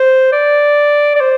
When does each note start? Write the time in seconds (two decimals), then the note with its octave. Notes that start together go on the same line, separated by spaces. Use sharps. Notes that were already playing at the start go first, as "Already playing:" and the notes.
Already playing: C5
0.32 D5
1.16 D5
1.20 C5